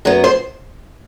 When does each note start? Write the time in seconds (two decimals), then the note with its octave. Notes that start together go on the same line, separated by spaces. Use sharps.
0.05 F#2 F#3 B3
0.24 C5